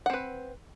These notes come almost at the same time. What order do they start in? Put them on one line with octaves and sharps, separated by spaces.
F#5 C4 B4